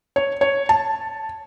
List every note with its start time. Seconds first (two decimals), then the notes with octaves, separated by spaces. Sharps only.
0.16 C#5
0.41 C#5
0.69 A5